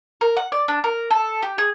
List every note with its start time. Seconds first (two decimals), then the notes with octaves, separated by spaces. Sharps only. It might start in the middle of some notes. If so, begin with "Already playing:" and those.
0.21 A#4
0.37 F#5
0.52 D5
0.68 D4
0.84 A#4
1.11 A4
1.42 G4
1.58 G#4